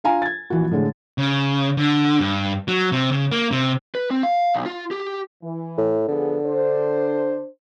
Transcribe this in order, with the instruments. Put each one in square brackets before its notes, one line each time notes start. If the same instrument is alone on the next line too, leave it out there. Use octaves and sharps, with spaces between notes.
[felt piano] D4 F4 F5 G#5 A#5
G#6 A6
A#1 E3 F#4
A2 D3 G#3
[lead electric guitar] C#3
D3
G2
F#3
C3
C#3
A#3
C3
[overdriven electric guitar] B4
C4
F5
B1
F4
G4
[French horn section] E3
[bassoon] A2
[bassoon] D3 [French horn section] F3 B3 G#4
[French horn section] D4 C5